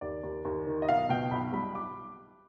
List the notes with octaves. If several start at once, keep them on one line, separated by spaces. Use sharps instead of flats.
D#2 D5
D#2
D#2
D#3
D#5
B1 F5
B2 G5
B1 B5
G3 B5
D6